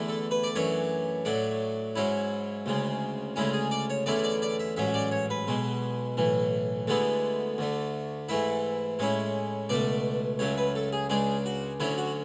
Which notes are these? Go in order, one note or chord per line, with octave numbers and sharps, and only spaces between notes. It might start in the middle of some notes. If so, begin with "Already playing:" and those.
Already playing: E2 D3 A3 E4
A4
B4
D5
F#2 E3 A3 D4 C#5
A2 F#3 A3 D4
G#2 F#3 C#4 E4
D2 C#3 G#3
D2 C#3 G#3 C#4 E4
G#4
D5
C#5
E2 D3 A3 C#4 E4 D5
D5
D5
E5
A1 G#2 F#3 C#4 E5
D5
C#5
B4
B1 B2 G#3
B1 A2 E3
D2 D3 G#3 B3 E4 A4
D2 D3 A3
G#2 E3 A3 E4 E5
A2 G#3 C#4 E4
C#2 B2 A3 D5
C#2 C#3 F#3 A3 C#5
B4
A4
G#4
C#2 C#3 G#3 D4 G#4
F#4
D2 D3 F#3 C#4 E4
F#4